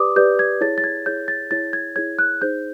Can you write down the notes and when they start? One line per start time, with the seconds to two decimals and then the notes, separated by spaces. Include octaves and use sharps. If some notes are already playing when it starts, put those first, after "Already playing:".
Already playing: G4 B4 D5 D6 D#6
0.16 G4 B4 D5 G6
0.39 G#6
0.61 E4 G#4 C#5 A6
0.78 A6
0.84 G#6
1.06 E4 G#4 C#5 G6
1.28 A6
1.51 E4 G#4 C#5 A6
1.73 G#6
1.96 E4 G#4 C#5 G#6
2.19 F#6
2.42 D#4 G#4 C5 G6